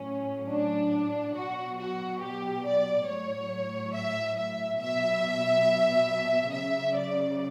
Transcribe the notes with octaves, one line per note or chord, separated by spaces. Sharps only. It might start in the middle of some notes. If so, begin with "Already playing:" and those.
Already playing: A2 F#3 C#4
D4
B2 F#3 F#4
F#4
G4
D5
A2 F#3 C#5
E5
E5
B2 F#3 E5
C#3 F#3 E5
D5